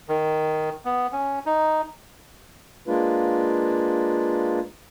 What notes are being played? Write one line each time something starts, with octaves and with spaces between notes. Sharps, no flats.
D#3
B3
C#4
D#4
G#3 A#3 D4 F4 B4